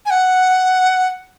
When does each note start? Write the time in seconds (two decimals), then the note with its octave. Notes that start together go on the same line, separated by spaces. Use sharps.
0.06 G#5
0.10 F#5